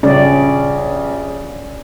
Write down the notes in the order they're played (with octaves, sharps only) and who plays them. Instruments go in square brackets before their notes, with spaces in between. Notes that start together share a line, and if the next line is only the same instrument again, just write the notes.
[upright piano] A#1 G2 C#3 [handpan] C#4 D5